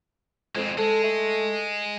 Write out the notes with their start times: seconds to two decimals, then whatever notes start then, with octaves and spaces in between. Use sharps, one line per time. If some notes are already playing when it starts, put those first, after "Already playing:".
0.55 F2 G#3 C4
0.78 G#3 A4
1.03 A3